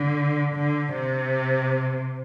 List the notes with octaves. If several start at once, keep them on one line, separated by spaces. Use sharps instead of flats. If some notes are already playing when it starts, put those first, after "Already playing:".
Already playing: D3
D3
C3